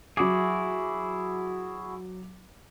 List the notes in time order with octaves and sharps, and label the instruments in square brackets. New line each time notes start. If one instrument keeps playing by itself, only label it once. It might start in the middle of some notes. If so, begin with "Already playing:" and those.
[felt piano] F#3 D6 [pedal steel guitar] E4 F#4 G#4